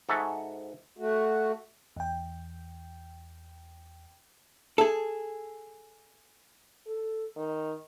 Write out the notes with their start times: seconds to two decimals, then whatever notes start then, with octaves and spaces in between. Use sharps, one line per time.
0.09 G#2 F#4 A4 E5 G#5
0.97 A3 F#4
1.96 E2 G5
4.78 G#4 A4
6.86 A4
7.36 D#3